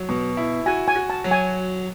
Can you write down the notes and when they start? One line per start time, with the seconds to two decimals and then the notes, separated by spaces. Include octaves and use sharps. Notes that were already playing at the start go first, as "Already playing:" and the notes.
Already playing: F#3
0.09 B2
0.37 E4
0.66 F#4 G#5
0.88 G#5
0.96 F#4
1.10 A5
1.24 F#3
1.31 G#5